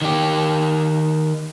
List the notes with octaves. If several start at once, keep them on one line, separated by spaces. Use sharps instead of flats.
D#3 G4